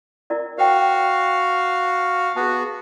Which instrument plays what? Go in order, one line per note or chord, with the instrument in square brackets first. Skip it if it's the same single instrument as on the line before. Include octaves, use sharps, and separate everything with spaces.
[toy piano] E4 A#4 D5
[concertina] F#4 F5 [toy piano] C5 G5
[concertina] B3 F#4 [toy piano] G#4 A5